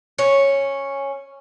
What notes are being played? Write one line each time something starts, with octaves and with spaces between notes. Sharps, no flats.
C#4